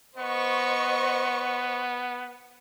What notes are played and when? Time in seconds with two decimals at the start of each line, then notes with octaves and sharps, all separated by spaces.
0.18 B3 C5 D#5 C#6